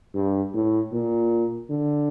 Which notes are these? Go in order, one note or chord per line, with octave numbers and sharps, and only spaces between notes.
G2
A2
A#2
D3